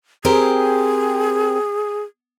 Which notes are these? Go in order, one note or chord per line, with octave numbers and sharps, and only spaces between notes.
C4 G4 G#4 A#4